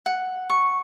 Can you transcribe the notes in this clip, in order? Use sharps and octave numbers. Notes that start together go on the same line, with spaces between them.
F#5
C#6